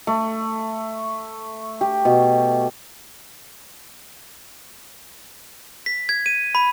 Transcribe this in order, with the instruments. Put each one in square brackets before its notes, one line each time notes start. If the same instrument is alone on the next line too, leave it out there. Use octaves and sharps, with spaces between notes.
[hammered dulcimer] A3
G4
B2
[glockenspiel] B6
G#6
D#7
B5